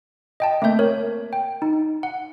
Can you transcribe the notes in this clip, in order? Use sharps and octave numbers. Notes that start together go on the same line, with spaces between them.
D#5 G5 A5
A3 A#3 C4 E5 G6
A#4 C#5
G5
D#4
F#5